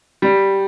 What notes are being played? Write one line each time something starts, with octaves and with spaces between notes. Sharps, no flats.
G3